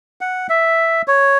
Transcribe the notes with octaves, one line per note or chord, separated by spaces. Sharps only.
F#5
E5
C#5